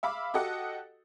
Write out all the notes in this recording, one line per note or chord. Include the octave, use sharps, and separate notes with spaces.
E5 F5 B5 D6
F#4 G4 A4 D#5 F#5